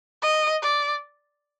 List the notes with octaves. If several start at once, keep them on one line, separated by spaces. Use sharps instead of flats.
D#5
D5